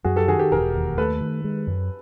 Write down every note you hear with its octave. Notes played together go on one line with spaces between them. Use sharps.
F#2 F#4 G#4
G4 A4
D#3 F#4 G#4
G4 A4
E1 G#4 A#4
D#2
A3 A4 B4
D#3
G#3
F#2